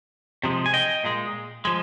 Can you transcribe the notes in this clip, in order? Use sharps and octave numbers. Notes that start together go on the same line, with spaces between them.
C3 F3 G#3
G#5
D#5 G5
A#2 G#3
F3 G#3